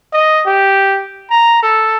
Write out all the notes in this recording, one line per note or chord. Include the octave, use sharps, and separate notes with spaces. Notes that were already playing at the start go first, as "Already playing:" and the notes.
D#5
G4
A#5
A4